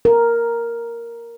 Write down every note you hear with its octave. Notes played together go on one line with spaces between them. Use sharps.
A#4